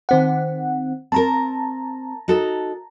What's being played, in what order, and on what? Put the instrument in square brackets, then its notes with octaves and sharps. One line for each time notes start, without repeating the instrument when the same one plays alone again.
[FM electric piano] D#3 C4 F#5
[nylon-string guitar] C4 A#4 [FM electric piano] A5 A#5
[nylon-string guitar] D#4 F#4 A4